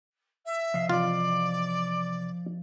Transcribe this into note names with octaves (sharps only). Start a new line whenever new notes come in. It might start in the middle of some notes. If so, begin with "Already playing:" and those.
E5
C3 F3 D#5 F5
C3 E3 F4 D5